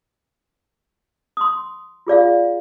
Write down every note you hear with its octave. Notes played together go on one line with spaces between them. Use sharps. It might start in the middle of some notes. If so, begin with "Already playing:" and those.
C6 D#6
F4 G#4 D5 F5